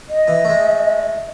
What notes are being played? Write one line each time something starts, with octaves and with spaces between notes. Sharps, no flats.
D#5
E3
G#3 A3